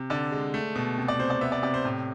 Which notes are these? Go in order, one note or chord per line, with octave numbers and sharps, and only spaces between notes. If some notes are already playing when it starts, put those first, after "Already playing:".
Already playing: C3
D3 D5
G#3
A3
B2
C3
D5
C3 C5
D5
B3 E5
D5
C3 D5
C5
A2